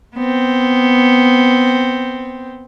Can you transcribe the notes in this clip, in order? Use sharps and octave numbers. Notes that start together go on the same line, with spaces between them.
B3 C4